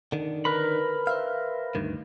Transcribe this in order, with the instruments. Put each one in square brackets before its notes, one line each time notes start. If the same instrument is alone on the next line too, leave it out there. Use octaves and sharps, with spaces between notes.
[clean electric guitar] D3 D#3
[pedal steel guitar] A#4 B4 B5
[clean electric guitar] C5 E5 F5
D2 G2 D#3